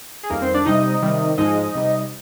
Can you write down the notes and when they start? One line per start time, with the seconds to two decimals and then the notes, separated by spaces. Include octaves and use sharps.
0.23 G#4
0.30 F2 D#3 G3 A#3 A#4
0.42 C4 C5
0.54 D4 D5
0.66 C3 G3 D#4 D#5
1.02 C3 D#3 G3
1.38 G#2 F3 G#3 D#4 D#5
1.75 C3 G3